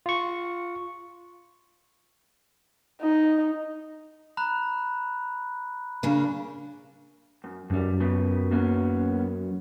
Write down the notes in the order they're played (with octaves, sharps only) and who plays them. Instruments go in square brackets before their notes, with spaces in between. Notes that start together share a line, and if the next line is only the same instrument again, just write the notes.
[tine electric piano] F4 C#6
[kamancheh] D#4
[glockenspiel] A#5 B5 F#6
[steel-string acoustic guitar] C#3 A#3 D4
[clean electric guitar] F#2
[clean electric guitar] C#2 G3 [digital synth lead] F#2
[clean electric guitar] C#3 B3
A#3 B3 C#4